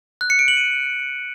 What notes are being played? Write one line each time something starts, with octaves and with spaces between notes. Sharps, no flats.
F#6
C#7
D7
F#7
D#7